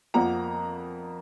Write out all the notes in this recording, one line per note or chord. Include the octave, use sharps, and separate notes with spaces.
F2 F3 A#3 F#5 A#5